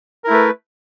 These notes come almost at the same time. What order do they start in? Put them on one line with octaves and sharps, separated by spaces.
A#4 E4 A3 B4